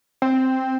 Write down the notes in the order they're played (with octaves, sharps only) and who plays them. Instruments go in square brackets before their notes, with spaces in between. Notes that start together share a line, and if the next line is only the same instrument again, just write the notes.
[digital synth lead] C4